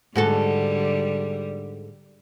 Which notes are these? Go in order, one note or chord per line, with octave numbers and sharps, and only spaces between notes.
G#2 D3 G3 F#4 A4